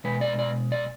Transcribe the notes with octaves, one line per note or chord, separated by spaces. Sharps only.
B2 G#3 B4
D5
D5
D5